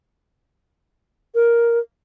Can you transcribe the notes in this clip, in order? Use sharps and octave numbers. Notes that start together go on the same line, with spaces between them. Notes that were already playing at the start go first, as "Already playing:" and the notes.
A#4